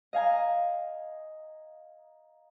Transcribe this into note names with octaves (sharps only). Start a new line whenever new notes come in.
D#5 F5 G#5 A#5